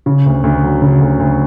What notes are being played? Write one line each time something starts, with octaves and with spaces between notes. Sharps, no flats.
C#3
D2
D2
F#3
C#3
D2
D2